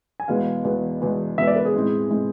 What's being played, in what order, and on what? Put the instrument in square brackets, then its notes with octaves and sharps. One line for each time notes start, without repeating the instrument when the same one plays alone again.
[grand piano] G#5
[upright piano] E2 B2 G#3 B3 [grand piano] F5
[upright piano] E2 B2 G#3 B3
E2 B2 G#3 B3
[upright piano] E2 B2 G#3 B3 [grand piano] E5
[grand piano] D5
B4
G#4
[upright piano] A2 G#3 C4 E4
A2 G#3 C4 E4